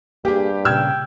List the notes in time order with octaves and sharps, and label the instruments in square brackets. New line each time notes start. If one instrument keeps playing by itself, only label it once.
[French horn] G2 [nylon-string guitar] A#3 G#4 [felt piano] G4 G5
[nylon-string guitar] A#2 C#3 [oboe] G5 [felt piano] E6 F6 G#6